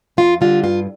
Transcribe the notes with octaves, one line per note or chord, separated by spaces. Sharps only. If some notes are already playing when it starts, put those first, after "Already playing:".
F2 F4
D3 G3 F4
G2 F4